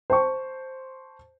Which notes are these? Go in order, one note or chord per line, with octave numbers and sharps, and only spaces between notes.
C5 A5 C#6